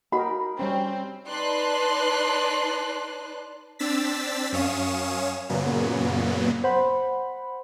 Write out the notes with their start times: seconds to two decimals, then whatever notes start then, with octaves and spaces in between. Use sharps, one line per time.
0.12 D#4 F#4 A#4 F#5 B5
0.59 G3 C4 C#4
1.28 D#4 B4 D5 A5 C6 F#6
3.79 C4 D4 E6 A6 B6
4.52 F#2 C#4 C#5 F5 D#6 E7
5.49 F#2 A#2 C#3 F#3 A#3 B3
6.64 C5 F#5 B5